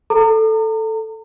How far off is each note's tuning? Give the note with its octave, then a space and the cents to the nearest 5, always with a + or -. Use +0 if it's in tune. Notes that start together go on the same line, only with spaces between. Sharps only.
A4 +0 A#5 -35